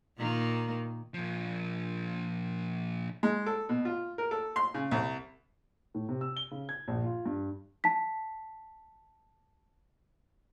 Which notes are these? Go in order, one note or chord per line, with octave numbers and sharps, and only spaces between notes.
A#2 D#3 A#3
A#2 F3
G#3
A4
B2
F4
A#4
A4
C6
C#3
C2
A2
C3
E6
G7
C#3
G#6
A#1
F4
G2
A5 B6